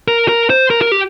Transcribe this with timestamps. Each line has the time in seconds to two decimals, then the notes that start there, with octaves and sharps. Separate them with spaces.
0.08 A#4
0.29 A#4
0.50 C5
0.71 A#4
0.82 A#4
0.92 G4